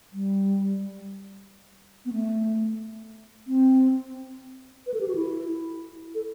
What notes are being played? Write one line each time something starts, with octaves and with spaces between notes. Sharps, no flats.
G3
B3
A3
C4
B4
A4
G4
F#4
E4
A4